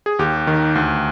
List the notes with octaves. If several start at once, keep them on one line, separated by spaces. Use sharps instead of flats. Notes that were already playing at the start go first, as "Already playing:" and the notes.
G#4
D#2 G4
D#3
D2